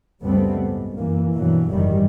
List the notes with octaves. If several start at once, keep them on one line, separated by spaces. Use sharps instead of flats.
C#2 F#2 G3 A3 B3 C4
G#2
F#2 E3 A#3
G2 B2 E3 F#3
F#1 G#2 D#3 E3 G3